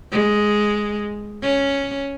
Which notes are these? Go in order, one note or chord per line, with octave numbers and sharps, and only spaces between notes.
G#3
C#4